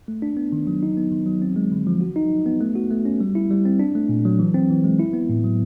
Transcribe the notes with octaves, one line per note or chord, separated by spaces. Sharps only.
A3
D4
B3
D#3
F#3
D#4
B3
D#3
F#3
C4
G#3
D3
F3
F#4
D#4
F#3
B3
A3
F#4
A3
C#4
G3
E4
G3
C4
D4
A3
A#2
F#3
E3
C4
E3
G#3
E4
B3
A2
F#3